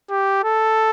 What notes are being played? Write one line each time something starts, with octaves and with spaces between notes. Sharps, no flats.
G4
A4